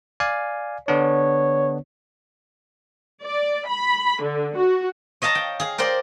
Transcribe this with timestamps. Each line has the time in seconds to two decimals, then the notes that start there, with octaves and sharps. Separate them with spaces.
0.20 D5 F5 G#5
0.88 D3 B3 D4 C#5
3.21 D5
3.67 B5
4.21 D3
4.55 F#4
5.22 C#5 D#5 F5 A5 A#5
5.35 G5
5.60 G#4 F5
5.78 A#4 C5 D5 G5